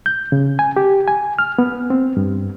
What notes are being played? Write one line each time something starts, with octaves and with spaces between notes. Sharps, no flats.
G6
C#3
G#5
G4
G#5
F6
B3
C4
G2